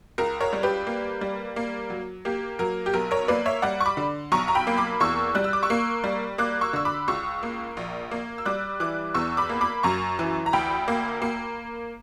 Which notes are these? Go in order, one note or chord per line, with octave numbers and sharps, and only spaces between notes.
C#2 A#4
A#4 C#5
G3
G4 B4
A#3
G3
A#3
F#3
A#3 G4
F#3 A#4
G4
B1 A#4
A#4 C#5
A#3 B4 D5
C#5 E5
G3 D5 F#5
C#6
B5 D6
D3
B1 A#5 C#6
A#5
G5 B5
A#3
B5 D6
E2 C#6 E6
G3 F#6
E6
D6
C#6 E6
A#3
G3
A#3 D6 F#6
C#6 E6
D3 E6
B5 D6
C#2 C#6 E6
A#3
A#1
A#3
E6
G3 D6 F#6
E3 D6 F#6
E2 C#6 E6
B5 D6
A#3
B5 D6
F#2 A#5 C#6
E3
A#5
D2 G5 B5
A#3
A#3